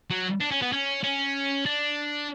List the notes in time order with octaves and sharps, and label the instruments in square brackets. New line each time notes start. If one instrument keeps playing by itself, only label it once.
[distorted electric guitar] F#3
D4
C#4
B3
C#4
C#4
D4